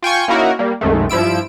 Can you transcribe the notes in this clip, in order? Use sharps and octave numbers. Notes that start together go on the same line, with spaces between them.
F4 G5 G#5 C#6
A#3 C#4 D#4 E4 F#4 A#4
G3 A#3
C2 F#2 D#3 G#3 A3
G2 F3 E4 E6 D7